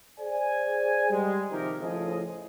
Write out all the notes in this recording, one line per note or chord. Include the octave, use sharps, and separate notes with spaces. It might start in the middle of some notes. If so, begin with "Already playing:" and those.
G#4 C5 D5 G#5
G3 G#3
C3 D#3 F3 D#4 G4 A#4
A2 C#3 F3 G#4 A4 D#5